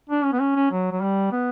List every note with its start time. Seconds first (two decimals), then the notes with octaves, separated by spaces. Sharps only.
0.09 D4
0.24 C#4
0.33 B3
0.40 C#4
0.56 C#4
0.71 F#3
0.92 F#3
1.01 G3
1.32 B3